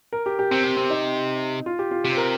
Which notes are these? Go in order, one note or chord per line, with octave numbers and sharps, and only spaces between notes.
A#4
G4
G4
C3 C4
C4
C4
D#4
F4
G4
F4
C3 G4
C5
A#4